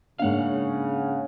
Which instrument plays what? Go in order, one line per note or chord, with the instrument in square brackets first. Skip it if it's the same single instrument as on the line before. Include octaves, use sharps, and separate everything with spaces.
[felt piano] G#2 A#3 D4 [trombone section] C#3 [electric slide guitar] F5 F#5